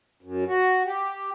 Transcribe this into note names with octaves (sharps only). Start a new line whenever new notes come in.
F#2
F#4
G4